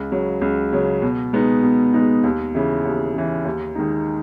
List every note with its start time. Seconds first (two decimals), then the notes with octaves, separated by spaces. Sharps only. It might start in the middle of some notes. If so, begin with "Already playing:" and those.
Already playing: C#2
0.12 C#3 F#3
0.41 C#2
0.73 C#3 F#3
1.02 B2
1.33 G#3 B3 D#4
1.63 B2
1.94 G#3 B3 D#4
2.24 D#2
2.55 C#3 E3
2.85 D#2
3.15 C#3 E3
3.45 D#2
3.75 D#3 G#3 D#4